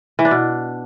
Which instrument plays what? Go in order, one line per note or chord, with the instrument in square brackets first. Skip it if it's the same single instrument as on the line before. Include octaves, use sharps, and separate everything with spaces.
[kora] E3
D4
B2